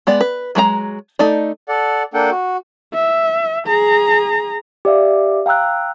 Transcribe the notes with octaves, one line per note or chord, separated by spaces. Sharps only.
G#3 B3 D5
B4
F#3 G#3 G#4 A#5
A3 D#4 D5
A4 D5 F#5
A#3 D4 A4 F#5 G5
F#4
E5
G#4 A#5
G4 D5 E5 F5
F5 G5 A#5 E6 F#6